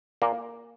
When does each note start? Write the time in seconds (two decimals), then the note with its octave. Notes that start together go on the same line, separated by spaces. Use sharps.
0.22 A#2 A#3